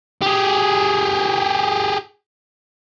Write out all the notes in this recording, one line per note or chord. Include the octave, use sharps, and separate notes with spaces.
G4 G#4